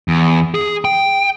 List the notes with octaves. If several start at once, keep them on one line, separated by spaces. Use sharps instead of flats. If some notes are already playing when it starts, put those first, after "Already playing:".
E2
G#4
G5